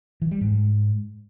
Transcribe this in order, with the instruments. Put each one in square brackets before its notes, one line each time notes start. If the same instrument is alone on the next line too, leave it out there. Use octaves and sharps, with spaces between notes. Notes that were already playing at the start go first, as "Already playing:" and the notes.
[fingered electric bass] E3
G3
G#2